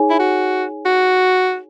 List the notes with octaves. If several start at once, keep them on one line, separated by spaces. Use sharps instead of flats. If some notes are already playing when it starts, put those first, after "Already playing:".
Already playing: D#4 G#4 C#5 G#5
E4
F#4
F#4